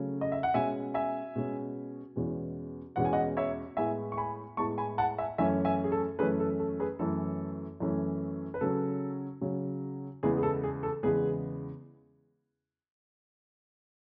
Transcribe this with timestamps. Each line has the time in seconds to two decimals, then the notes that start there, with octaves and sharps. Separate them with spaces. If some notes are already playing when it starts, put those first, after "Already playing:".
Already playing: C#3 F#3 A3 C#4
0.21 D#5
0.32 E5
0.43 F#5
0.54 B2 G#3 C#4 E5 G#5
0.94 E5 G#5
1.36 B2 G#3 C#4
2.16 E2 B2 G#3 C#4
2.96 E2 B2 G#3 C#4 F#5
3.05 G#5
3.13 D#5 F#5
3.37 C#5 E5
3.77 A2 G#3 B3 E5 G#5
4.12 C#6
4.17 G#5 B5
4.57 A2 G#3 B3 A5 C#6
4.78 G#5 B5
4.98 F#5 A5
5.18 E5 G#5
5.38 F#2 E3 A3 C#4 E5 G#5
5.65 E5 G#5
5.84 G#4
5.92 A4
6.19 F#2 E3 A3 C#4 G#4 B4
6.40 A4
6.59 A4
6.80 G#4 B4
6.99 F#2 E3 A3 C#4 A4
7.80 F#2 E3 A3 C#4
8.54 B4
8.61 C#3 F#3 C#4 A4
9.41 C#3 F#3 C#4
10.23 E2 C#3 E3 G#3 B3 G#4
10.37 G#4
10.43 A4
10.64 G#4
10.83 A4
11.03 E2 C#3 E3 G#3 B3 G#4 B4